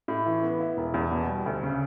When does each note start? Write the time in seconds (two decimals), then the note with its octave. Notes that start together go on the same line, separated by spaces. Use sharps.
0.08 A2
0.26 E3
0.43 B3
0.60 E4
0.77 E1
0.94 E2
1.12 B2
1.28 G3
1.46 D2
1.63 C#3